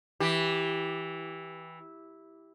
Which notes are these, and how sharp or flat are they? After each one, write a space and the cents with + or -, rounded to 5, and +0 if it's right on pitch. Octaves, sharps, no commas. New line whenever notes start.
E3 -10 G4 +0